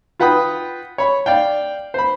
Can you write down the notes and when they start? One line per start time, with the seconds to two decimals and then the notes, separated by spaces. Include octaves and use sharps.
0.20 F4 B4 F#5 G5 B5 D#6
0.98 C#5 B5
1.26 D5 F5 G5
1.94 C5 B5